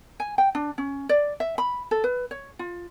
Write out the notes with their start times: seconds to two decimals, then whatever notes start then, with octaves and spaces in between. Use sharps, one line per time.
0.20 G#5
0.38 G5
0.55 D4
0.78 C#4
1.09 D5
1.40 E5
1.58 B5
1.91 A4
2.04 B4
2.31 C#5
2.59 F4